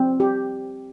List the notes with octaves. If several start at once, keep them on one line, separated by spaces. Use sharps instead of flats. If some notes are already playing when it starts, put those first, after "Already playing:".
Already playing: C4
G4